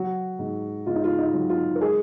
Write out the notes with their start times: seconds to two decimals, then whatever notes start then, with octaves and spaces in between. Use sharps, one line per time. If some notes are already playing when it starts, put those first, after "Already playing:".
Already playing: F#3 F#4
0.39 G#2
0.86 G#2 F4
0.95 D#4
1.04 F4
1.18 D#4
1.33 F#3
1.49 F4
1.75 A#4
1.81 G#3 G#4